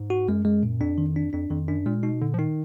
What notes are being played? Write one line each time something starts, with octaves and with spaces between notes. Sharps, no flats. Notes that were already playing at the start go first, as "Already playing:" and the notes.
Already playing: G#2
F#4
F#2 G#3
G#3
A#2
F2 D4
D#3
D4
F2 D4
F2 D#3
F#2 D4
A#2 G#3
B2 D#4
A#2 D3
F3
D#3 D#4